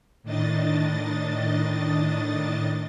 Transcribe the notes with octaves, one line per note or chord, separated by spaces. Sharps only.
A2 D#3 D4 D#5 A6